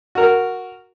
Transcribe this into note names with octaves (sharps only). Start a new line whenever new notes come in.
F#4 A#4